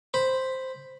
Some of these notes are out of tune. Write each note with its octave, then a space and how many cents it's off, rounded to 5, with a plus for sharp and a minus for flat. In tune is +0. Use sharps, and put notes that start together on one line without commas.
C5 +0 B5 +0